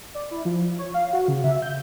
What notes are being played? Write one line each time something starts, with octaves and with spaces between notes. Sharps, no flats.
D5
E4
F3
C#5
F5
F#4
C#3
E5
G6